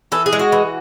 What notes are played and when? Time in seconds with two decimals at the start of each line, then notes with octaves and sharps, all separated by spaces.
0.12 E3 A4
0.26 G#4
0.33 G#3
0.39 F#4
0.52 E3